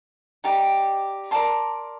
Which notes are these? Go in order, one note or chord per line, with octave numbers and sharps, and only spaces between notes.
D#4 G4 D5
A#4 D5 A5 C6